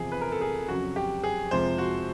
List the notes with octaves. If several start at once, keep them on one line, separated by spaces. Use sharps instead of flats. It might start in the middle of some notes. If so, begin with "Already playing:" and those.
Already playing: E2 C3 F3 G#4
B4
A#4
A4
G#4
F2 C#3 F#3 F#4
G4
G#4
F2 C3 F3 G#3 C5
F#4